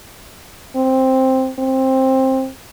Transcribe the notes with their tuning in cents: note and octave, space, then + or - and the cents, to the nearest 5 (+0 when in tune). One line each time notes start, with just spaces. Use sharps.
C4 +5
C4 +15